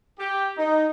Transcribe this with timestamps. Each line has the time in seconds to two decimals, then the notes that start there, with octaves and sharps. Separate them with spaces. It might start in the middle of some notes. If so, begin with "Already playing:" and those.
0.18 G4
0.57 D#4